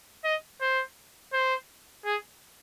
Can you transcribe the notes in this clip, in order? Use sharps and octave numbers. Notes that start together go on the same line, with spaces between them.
D#5
C5
C5
G#4